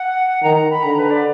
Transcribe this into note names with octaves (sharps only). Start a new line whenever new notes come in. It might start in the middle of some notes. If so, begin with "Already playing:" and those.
Already playing: F#5
D#3 A#5
A#5
B5
D3 A#5
B4
D5